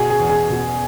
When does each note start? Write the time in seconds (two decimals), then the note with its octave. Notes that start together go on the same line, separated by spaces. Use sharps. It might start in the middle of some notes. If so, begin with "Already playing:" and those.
Already playing: B2 G#4
0.10 G#4
0.20 E2
0.29 G#4
0.50 B2